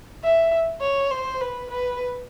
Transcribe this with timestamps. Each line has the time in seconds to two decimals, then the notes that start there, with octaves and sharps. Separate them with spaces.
0.23 E5
0.81 C#5
1.11 C5
1.41 B4
1.71 B4